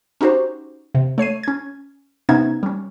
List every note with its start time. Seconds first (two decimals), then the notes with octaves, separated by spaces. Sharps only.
0.21 C#4 D#4 F#4 G4 C5
0.95 C3
1.18 A3 C#5 C7 D#7
1.43 C#4 G#6
2.29 C3 B3 C#4 D#4 E5 G#6
2.63 G3 C#4